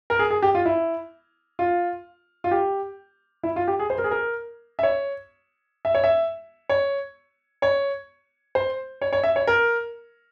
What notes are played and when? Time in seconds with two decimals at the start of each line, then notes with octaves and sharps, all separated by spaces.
0.10 A#4
0.19 G#4
0.30 G#4
0.42 G4
0.55 F4
0.65 E4
1.59 F4
2.44 F4
2.51 G4
3.43 E4
3.56 F4
3.68 G4
3.79 G#4
3.90 C5
3.98 A#4
4.04 G#4
4.11 A#4
4.79 E5
4.83 C#5
5.85 E5
5.95 C#5
6.04 E5
6.69 C#5
7.62 C#5
8.55 C5
9.01 C#5
9.13 C#5
9.24 E5
9.36 C#5
9.47 A#4